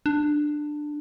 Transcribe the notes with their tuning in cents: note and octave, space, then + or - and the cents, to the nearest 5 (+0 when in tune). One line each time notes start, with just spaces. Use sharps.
D4 +15